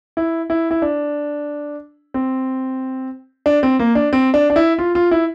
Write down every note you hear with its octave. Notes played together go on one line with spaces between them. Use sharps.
E4
E4
E4
D4
C4
D4
C4
A#3
D4
C4
D4
D4
E4
F4
F4
E4